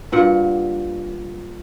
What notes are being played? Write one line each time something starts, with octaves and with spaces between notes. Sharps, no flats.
G2 A#2 F#5